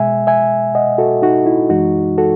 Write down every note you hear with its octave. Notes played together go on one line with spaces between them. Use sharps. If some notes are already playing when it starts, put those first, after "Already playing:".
Already playing: B2 G#3 E5 G#5
E5 G#5
D#5 F#5
F#4 A4
D#4 F#4
E4
F#2 E3 G#3 D#4 F#4
F#4 A4